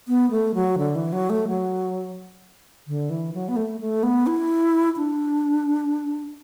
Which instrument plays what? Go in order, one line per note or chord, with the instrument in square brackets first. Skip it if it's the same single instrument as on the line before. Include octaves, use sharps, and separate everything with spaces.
[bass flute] B3
A3
F#3
D3
E3
F#3
A3
F#3
D3
E3
F#3
B3
A3
A3
B3
E4
D4